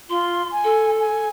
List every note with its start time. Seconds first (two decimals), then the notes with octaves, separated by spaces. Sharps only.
0.10 F4 C6
0.52 G#5
0.64 A4
1.00 G#5